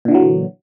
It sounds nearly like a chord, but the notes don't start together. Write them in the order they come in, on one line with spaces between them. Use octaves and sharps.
A#2 D3 E3 F#3